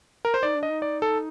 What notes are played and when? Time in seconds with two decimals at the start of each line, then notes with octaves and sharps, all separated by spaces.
0.25 A#4
0.34 C5
0.42 D#4 D5
0.56 D4
0.63 D#5
0.70 D#4
0.82 D5
1.02 A4